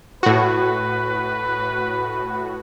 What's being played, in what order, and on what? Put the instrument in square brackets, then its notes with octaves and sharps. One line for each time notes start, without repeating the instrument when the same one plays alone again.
[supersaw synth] A2 F#4 [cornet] B4